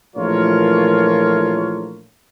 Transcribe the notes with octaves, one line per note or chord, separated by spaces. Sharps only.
A#1 E3 A3 F4 A#4 C#5